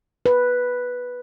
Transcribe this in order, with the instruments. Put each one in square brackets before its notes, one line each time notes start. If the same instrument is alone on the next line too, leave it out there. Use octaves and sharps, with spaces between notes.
[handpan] B4